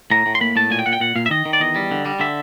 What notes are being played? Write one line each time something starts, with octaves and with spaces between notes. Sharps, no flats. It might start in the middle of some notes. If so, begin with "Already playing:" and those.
A2 A#5
A2
C6
A#3 B5
A2 A5
A#2 G#5
G5
A#2 F#5
G5
A#2 F#5
A#2 F5
E5
D#3 D#5
D#3
D5
E2 D#5
G3
D3
G3
D3 E5